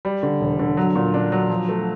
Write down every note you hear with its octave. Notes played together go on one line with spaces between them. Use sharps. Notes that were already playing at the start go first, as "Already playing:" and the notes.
G3
D3
E1
D3
F#3
A#2
D4
F#3
F3
A3